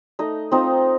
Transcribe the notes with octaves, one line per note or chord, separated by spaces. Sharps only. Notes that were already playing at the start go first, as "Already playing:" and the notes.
A3 D#4 D#5
C4 D#4 F4 D#5